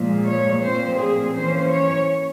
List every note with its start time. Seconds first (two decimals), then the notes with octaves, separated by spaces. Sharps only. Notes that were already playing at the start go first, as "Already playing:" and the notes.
Already playing: A#2 F3 G#3
0.27 C#5
0.63 A#2 F3 C4 C5
0.99 G#4
1.35 E3 A#3 C#4 C5
1.70 C#5